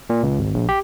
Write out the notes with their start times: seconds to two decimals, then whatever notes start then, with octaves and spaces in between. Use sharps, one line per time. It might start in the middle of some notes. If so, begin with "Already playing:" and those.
0.10 A#2
0.23 C#2
0.39 G#1
0.54 A#1
0.69 G4